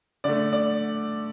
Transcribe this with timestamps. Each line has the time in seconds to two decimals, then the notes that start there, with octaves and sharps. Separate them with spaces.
0.24 D3 A3 D5
0.53 D5